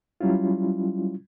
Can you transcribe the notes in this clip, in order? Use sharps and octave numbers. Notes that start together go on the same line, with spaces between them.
F#3 G3 C#4 E4 F4